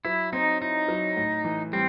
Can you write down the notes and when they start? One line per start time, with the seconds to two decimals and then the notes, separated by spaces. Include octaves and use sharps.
0.05 F#3 E4
0.33 C4 D#4
0.61 D#4 E4
0.88 F#3
1.17 A2
1.44 E3
1.73 G3 C4